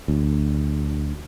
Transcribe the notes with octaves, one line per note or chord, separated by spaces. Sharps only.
D2